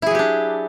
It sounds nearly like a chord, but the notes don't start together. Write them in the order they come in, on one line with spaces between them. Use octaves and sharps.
E4 G#4 F#3 G4 D4